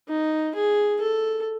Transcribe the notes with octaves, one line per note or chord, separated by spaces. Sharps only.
D#4
G#4
A4